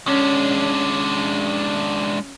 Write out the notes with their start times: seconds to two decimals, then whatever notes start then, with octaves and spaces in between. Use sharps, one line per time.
0.07 G#3 C#4 D4